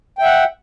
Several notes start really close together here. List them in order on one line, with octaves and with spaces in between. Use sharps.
G5 E5 F#5